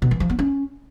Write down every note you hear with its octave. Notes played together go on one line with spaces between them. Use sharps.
B2
E3
F3
B3
C#4